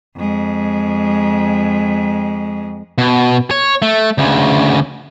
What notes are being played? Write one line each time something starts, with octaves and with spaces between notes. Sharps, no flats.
F2 G#3
B2
C#5
A3
D2 C#3